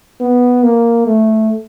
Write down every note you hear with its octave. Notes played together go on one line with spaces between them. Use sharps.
B3
A#3
A3